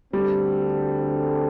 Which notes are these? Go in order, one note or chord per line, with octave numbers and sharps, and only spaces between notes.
D2 D3 G3 C4 A4